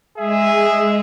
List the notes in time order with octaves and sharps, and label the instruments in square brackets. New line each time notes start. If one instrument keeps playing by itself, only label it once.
[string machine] G#3 [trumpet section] G#4 E5